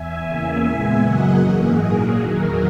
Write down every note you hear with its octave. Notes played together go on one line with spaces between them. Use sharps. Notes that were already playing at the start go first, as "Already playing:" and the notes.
Already playing: E2 E5 G#5
E2 C#3 E3 A#3
A#2 G#3 B3
F#2 C#3 F#3 A#3 D#5 F#5
G#2 E3 A#3 G#4
A#2 F#3 A#3
E2 D#3 F#3 A#4